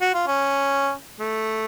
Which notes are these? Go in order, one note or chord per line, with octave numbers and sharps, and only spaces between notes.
F#4
F4
C#4
A3